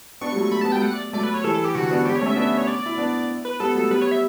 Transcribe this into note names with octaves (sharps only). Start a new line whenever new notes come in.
B3 D4 C#6
G3
F#3 A3
A3 B5
B3 A5
F#3 A3 G5
F#5
D5
F#3 A3 D5
B4
C#5
E3 G3 A4
A4
G4
D3 F#3 F#4
B3 D4
G3 B3 G4
C#5
A3 C#4
E5
B3 D4
C#5
D5
E4
B3 D4
B4
G3 B3 A4
F#3 A3
G3 B3 B4
C#5
E5